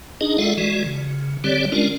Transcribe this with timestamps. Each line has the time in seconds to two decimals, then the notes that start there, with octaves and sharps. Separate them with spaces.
0.21 D4 D#4 G#4 D#5
0.38 G#3 F4 A4 D5 E5 F#5
0.57 E3 G#3 F#4 D5
0.86 C#3
1.44 D3 G3 C4 G4 C#5 D5
1.72 G#3 C#4 D4 F4 A#4 D5